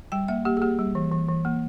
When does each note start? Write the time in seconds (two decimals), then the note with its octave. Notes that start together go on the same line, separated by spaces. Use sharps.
0.12 G3 G5
0.28 A#3 E5
0.45 A#3 G4
0.57 G#4
0.62 A#3 G4
0.79 G3
0.95 E3
1.12 E3
1.29 E3
1.45 A#3